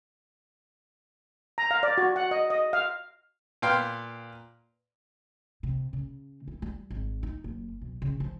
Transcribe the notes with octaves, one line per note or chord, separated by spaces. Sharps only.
A#5
F5
D5
F#4
F#5
D#5
D#5
F5
A#2 B4 F5 G5 C6
C3
C#3
E4
G3
G#1
D#4
F#1
B1
C#3
F3